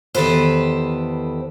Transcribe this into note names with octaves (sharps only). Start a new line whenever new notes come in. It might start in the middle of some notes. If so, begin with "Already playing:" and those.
E2 D#3 G4 A4 B4 C5